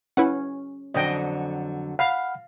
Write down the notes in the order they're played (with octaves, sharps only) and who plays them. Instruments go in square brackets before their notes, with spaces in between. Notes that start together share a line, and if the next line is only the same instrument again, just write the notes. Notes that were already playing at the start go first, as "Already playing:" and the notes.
[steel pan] C#4 [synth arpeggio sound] E4 B4 F#5
[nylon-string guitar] F2 D3 F#3 [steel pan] D#5 G5
[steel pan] F5 [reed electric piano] F#5 B5 F6